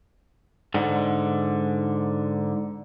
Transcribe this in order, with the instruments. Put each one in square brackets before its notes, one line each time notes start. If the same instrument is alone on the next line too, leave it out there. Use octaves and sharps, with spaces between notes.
[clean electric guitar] G#2 D3